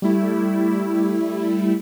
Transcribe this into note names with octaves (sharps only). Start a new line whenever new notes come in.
G3 A3 E4